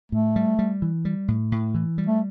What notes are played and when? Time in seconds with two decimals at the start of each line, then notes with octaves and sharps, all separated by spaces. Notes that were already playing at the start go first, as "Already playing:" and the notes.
0.12 A2 A3
0.36 G3
0.59 G3
0.82 E3
1.05 G3
1.28 A2
1.52 A2
1.75 E3
1.98 G3
2.07 A3